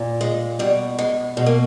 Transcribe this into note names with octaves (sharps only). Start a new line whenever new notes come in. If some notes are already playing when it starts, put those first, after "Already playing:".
Already playing: A#2
G#3
B2 G3
G#3
B2 G#3
A#3